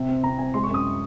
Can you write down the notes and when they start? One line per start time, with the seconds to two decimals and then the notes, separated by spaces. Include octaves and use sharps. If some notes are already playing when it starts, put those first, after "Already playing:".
Already playing: C3
0.09 C4
0.24 C3 A#5
0.38 C4 G#5
0.54 G#3 C6
0.64 C#6
0.69 F#2 D#6